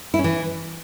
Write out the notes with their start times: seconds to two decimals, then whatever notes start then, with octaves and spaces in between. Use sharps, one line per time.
0.14 E4
0.19 C#4
0.24 E3